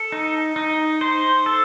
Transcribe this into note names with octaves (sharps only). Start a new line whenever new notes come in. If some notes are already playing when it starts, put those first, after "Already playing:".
Already playing: A4
D#4
D#4
C5
A4